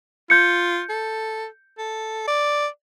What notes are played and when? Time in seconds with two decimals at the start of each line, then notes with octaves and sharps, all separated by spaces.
0.30 F4 G6 C#7
0.89 A4
1.78 A4
2.27 D5